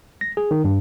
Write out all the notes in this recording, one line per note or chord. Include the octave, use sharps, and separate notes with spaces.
A#6
G#4
D#3
G2